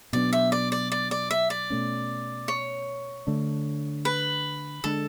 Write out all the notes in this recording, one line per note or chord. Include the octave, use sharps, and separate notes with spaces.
B2 F#3 B3 D4 D5
E5
D5
D5
D5
D5
E5
D5
B2 A3 C#4
C#5
D3 A3 D4
B4
D3 G#3 D4 A4